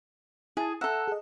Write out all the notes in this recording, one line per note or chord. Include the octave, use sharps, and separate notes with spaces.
E4 G#4 G#5 A5
A4 E5 F#5 A#5 E6
G#4 D#5